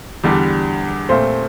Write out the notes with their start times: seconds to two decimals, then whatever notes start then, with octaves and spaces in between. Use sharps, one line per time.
0.24 E2 D3 G3 D4
1.09 A#2 A3 C4 F4 C5